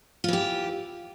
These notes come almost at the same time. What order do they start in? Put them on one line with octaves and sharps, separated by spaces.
F4 E3 G4